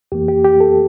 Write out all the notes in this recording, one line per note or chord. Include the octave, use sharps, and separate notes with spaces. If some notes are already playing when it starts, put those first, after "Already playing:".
F2 E3 A#3 G4
G4
G4
A4